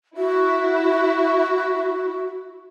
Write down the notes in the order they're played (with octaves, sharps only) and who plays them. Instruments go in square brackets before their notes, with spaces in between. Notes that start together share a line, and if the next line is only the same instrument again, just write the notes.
[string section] E4 E5 [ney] F#4